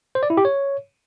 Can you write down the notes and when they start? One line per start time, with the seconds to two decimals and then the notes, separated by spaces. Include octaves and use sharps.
0.15 C5
0.23 D5
0.30 E4
0.37 G4
0.45 C#5